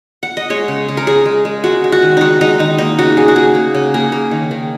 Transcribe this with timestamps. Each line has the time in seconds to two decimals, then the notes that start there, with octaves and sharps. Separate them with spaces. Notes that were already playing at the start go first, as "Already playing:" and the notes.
0.23 F#5
0.37 D#5
0.50 G#3 C#5
0.68 C#3
0.88 C#3
0.97 A#4
1.07 C#3 G#4
1.25 G#3
1.45 G#3
1.64 G#3 F#4
1.84 G#3
1.92 F#4
2.02 D#3
2.17 G#3 D#4 F#4
2.41 G#3 D#4
2.59 D#3 D#4
2.78 A#3 D#4
2.99 C#3 F#4
3.17 C#3 G#4
3.28 F#4
3.36 A#3 G#4
3.55 A#3
3.75 C#3
3.94 A#3 G#4
4.12 A#3
4.31 D#3
4.51 D#3